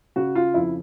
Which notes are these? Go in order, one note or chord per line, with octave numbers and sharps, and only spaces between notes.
C#3 F#4
F4
F2 E4